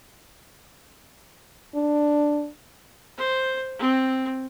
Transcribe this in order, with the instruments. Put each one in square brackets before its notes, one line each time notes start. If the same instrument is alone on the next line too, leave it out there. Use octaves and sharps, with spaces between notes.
[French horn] D4
[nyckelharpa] C5
C4